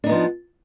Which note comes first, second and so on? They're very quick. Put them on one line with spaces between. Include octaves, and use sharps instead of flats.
D4 D#4 B3 F3